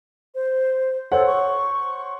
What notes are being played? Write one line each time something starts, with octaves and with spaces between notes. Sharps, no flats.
C5
A4 C5 C#5 F#5
C#6